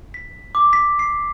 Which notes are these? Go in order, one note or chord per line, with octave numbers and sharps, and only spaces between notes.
B6
D6
B6
C7